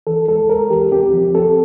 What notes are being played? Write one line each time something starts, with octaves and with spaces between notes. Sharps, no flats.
E3 A4
G#3 A4
G#3 A#4
E3 G4
C4 G4
F3
C4 A4